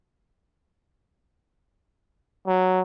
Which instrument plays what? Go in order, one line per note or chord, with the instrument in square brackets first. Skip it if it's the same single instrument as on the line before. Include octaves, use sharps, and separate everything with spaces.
[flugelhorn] F#3